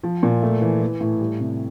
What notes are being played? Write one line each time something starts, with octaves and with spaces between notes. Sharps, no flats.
F3
A#2
A3
E3
E3
A2
G3
C3